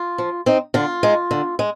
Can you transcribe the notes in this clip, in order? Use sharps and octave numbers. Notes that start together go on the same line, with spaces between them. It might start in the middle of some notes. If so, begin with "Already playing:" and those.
Already playing: F4
F3
C4 D#4
D3 F4
G#3 D#4
D3
G#3